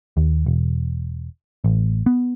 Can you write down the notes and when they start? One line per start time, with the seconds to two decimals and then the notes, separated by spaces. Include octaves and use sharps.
0.17 D#2
0.46 E1
1.64 A1
2.06 B3